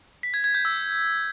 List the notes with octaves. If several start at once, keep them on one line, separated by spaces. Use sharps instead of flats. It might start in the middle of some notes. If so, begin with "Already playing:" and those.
B6
G#6
G#6
G6
E6